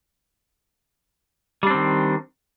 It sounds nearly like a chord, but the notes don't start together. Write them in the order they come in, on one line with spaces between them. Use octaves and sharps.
G3 D4 C4 D#3